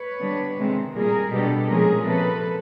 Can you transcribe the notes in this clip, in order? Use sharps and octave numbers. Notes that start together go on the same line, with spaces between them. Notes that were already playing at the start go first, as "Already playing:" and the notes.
Already playing: B4 C#5
D3 G3 B3 D4
C3 D#3 G#3 C4
A#2 G3 A#3 G#4 A#4
B2 G3 B3 D4 G4 A4
A#2 F3 G#3 C#4 G#4 A#4
C3 F3 A#3 C#4 A4 B4